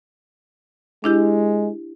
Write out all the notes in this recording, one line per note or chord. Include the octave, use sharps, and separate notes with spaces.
G#3 D4 E4 G4